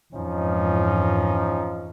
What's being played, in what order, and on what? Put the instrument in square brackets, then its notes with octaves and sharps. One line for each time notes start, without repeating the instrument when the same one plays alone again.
[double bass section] F2 G#2 E3 [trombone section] F3 C#4 D#4